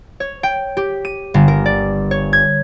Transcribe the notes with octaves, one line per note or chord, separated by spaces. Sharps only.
C#5
G5
G4
D#7
G1
A#4
D5
C#5
G#6